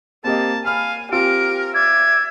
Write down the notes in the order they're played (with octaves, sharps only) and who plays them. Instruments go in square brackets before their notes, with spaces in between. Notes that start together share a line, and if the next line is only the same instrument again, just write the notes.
[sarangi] A#3 [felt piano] C4 G4 D#5 [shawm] A5
[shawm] F5 [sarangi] G#5 [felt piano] B5 F6
[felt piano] C4 F4 [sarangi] G4 [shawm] A#4 [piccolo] D7
[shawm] D5 [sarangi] E5 [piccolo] G#6